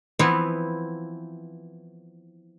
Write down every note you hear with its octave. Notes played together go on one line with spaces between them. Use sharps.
E3 F3 B3 C4 E4